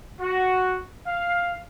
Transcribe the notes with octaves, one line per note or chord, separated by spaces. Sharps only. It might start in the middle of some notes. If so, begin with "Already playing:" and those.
F#4
F5